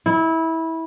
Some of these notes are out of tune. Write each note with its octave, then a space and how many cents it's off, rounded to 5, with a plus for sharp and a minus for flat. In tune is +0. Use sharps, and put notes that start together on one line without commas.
E4 -20